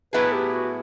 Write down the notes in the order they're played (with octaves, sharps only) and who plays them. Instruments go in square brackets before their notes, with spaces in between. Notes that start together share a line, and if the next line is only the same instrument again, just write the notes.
[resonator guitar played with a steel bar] A2 F#3 B3 E4 G#4 [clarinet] B4
[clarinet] G4
F#4